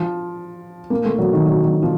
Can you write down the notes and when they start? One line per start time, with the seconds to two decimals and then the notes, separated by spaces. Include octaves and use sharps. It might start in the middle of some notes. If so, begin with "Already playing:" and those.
Already playing: F3
0.90 A#3
1.04 A3
1.18 F#3
1.32 D#3
1.46 F#3
1.63 F#3
1.82 F3